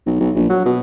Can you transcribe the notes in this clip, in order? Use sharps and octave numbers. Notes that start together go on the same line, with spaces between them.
B1
B1
A#1
F#3
B2